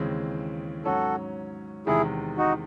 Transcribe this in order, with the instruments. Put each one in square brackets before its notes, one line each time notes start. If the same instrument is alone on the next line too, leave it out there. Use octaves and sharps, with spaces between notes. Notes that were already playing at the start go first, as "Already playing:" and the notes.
Already playing: [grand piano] D#2 C#3 E3 G#3 C4
[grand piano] G#2 F#3 C#4 [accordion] F#4 A4
[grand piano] E2 C3 D#3 G#3 [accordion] E4 G#4
[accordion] D#4 F#4